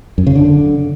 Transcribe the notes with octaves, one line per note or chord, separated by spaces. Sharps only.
F#2
C#3
D3